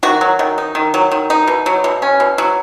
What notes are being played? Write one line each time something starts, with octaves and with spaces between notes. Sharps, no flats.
D#3 F#4
F#3
D#3
D#4
D#3
F#3
D#3
D#4
B2
F#3
B2
C#4
B2
F#3